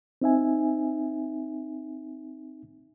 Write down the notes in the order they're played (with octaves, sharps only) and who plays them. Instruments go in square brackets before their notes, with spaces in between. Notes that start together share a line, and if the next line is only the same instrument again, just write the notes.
[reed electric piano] C4 D#4 E5 G#5